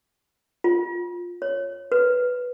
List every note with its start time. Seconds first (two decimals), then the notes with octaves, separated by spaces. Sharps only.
0.64 F4
1.42 C#5
1.92 B4